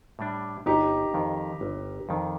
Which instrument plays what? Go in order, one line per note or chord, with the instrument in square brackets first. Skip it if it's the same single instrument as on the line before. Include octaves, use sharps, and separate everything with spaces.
[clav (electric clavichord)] A2 G3 D4
[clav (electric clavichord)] G1 [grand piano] D#4 G4
[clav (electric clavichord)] F2 D#3
G1
F2 D#3